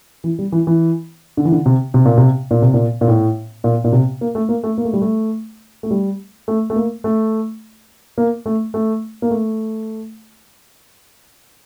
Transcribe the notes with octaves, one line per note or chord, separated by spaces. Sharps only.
E3
G3
E3
E3
D3
E3
D3
C3
C3
A#2
C3
A#2
C3
A#2
A#2
A2
A#2
A#2
C3
A#3
A3
A#3
A3
A#3
A3
G3
A3
A3
G3
A3
A3
A#3
A3
A#3
A3
A3
A#3
A3